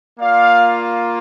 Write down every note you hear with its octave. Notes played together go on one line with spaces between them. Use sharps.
A#3 F4 D5 F5